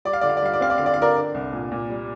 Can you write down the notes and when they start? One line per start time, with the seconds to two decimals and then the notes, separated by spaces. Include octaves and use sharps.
0.05 G3 D5
0.13 F5
0.21 D3 D5
0.29 F5
0.37 D5
0.43 G3 F5
0.54 D5
0.61 C4 F5
0.70 D5
0.78 D3 F5
0.86 D5
0.94 F5
0.98 D3 A#4 D5
1.16 D4
1.34 C2
1.53 A#2
1.72 A#2
1.90 G3